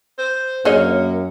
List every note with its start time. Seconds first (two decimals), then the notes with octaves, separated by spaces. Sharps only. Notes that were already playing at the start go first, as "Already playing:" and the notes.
0.18 C5
0.65 F#2 A#3 D4 G#4 C#5 D#5